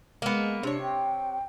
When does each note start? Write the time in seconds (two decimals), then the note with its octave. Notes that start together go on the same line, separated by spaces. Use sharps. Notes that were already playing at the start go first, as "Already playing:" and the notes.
0.22 G#3 A#3 B3
0.63 C3 D4 C#5
0.82 G5